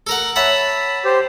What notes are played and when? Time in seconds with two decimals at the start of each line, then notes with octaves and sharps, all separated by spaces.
0.07 A4 A#4 F#5
0.36 C#5 E5 F#5 A5 B5
1.05 G4 C5